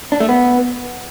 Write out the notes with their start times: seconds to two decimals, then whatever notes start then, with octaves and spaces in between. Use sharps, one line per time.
0.12 D4
0.20 A3
0.29 B3